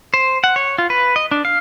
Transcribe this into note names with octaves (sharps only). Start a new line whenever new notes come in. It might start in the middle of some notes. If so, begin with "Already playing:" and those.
C5
F#5
C#5
F4
B4
D#5
D4
F5